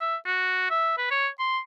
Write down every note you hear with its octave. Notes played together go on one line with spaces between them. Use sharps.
E5
F#4
E5
B4
C#5
C6